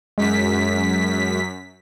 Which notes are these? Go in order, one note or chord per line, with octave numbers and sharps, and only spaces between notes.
F#2 G#3 B6